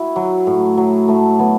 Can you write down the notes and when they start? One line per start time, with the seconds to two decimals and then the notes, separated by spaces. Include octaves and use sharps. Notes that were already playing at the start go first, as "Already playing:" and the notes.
Already playing: E4 F#4
0.16 F#3
0.47 A2
0.77 F#3
1.08 A2 A3
1.39 F#3 B3